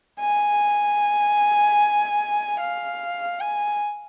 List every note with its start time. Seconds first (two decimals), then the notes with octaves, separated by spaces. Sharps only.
0.19 G#5
2.60 F5
3.40 G#5